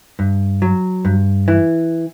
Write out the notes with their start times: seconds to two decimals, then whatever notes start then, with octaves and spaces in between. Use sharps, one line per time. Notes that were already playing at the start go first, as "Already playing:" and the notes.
0.19 G2
0.62 F#3
1.05 G2
1.48 E3